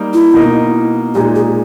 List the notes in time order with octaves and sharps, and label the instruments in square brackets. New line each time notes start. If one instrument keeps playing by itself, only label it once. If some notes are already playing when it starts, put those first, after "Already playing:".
Already playing: [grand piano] G3 A#3 D#4
[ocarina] E4
[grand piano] B2 A#3 D#4
[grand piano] A#2 G#3 D#4 [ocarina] G4
[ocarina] G#4